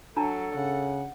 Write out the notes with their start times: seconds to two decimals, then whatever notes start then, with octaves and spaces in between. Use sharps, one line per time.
0.17 F#3 D4 A4 A5 A#5
0.56 C#3 F#5